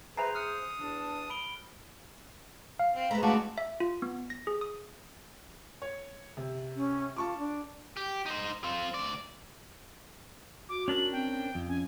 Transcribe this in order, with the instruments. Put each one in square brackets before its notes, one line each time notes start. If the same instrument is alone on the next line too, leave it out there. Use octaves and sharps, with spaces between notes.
[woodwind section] G#4 C5 [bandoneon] B4 [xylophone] E5 G#5 A#5 [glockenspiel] C7 F7
[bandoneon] D#6 [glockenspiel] F6 F#6 C#7
[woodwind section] E2 D4 A5
[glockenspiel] B5 D7 G7
[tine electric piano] F5
[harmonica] C4
[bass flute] G#3 [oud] A3 B3 [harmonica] A#5 B5
[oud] E3 C#4 [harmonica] F#4 B4 D5 [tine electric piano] F5 F#5 A5
[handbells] E5
F4
B3
A#6
G#4
D#6
[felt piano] C#5
C3
[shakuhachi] C#4
[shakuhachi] F4 [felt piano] A5 C#6 D6
[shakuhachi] D4
[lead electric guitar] G4
D#4 C5
C4 F4
D2 D5
[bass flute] F#4 [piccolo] D6
[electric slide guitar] C#4 D4 A#4 [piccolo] F#7
[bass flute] C4 [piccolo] G5
[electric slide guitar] F2
[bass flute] C#4 [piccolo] G#5